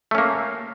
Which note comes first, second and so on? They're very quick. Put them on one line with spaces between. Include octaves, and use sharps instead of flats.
A3 C#4 A#3